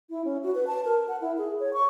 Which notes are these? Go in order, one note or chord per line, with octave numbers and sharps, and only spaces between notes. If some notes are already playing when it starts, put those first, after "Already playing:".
E4
C#4
F#4
B4
A5
A#4
F#5
E4
G#4
C#5
C#6